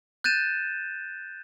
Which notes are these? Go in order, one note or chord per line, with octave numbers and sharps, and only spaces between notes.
F#6 G6 A6 D#7 E7